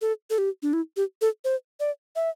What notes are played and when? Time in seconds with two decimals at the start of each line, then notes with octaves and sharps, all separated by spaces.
0.01 A4
0.30 A4
0.38 G4
0.63 D4
0.73 E4
0.97 G4
1.21 A4
1.44 C5
1.80 D5
2.16 E5